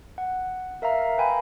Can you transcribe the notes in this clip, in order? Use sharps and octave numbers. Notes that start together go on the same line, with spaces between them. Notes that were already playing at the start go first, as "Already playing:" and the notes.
F#5
A#4 E5 F5 A#5
B4 F5 G5 G#5 A#5 B5